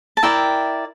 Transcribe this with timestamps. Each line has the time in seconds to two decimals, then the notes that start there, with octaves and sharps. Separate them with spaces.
0.17 A5
0.23 E4 A#4 D5 E5 G5